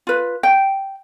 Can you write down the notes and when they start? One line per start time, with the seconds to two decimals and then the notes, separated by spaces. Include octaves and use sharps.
0.07 F4 B4
0.43 G5